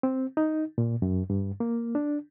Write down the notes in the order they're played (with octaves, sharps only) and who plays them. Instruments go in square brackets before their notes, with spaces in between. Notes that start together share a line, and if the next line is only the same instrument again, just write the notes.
[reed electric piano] C4
D#4
A#2
F#2
G2
A#3
D4